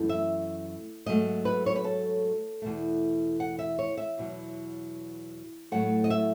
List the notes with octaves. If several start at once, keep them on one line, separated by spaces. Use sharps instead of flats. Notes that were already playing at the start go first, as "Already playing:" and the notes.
Already playing: F#2 E3 A3
E5
G#2 F#3 A3 D#5
B4
C#5
B4
A4
E2 B2 A3
F#5
E5
C#5
E5
E2 B2 F#3
A2 F#3 A3 F#5
D#5
E5